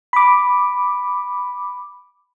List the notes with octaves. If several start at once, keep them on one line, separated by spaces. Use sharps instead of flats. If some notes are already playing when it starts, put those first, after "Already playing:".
B5 D6